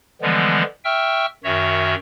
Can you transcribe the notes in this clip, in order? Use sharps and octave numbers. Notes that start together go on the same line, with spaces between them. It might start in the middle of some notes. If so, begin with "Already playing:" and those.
D3 E3 F3 G3 G#3 B3
E5 G5 C#6 E6 F6
F#2 D#3 F#4 C#5 E5